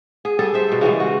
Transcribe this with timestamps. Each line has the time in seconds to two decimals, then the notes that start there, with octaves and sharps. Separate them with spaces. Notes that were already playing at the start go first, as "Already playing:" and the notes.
0.25 G#4
0.39 G3 G#4 A4
0.54 C5 E5
0.68 B2 C5
0.81 C#3 E3 G3 G#3
1.00 F#4